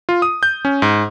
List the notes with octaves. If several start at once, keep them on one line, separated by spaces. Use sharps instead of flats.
F4
D#6
G6
C#4
G#2